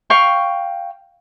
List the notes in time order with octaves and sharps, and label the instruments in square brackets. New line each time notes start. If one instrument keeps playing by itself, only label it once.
[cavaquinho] F5 G5 C#6